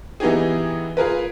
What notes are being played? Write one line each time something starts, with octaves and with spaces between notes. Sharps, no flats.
E3 B3 D#4 G4 G#4
F4 G#4 A#4 B4